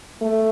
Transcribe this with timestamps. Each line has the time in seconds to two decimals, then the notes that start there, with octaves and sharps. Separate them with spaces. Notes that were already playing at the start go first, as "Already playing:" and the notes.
0.22 A3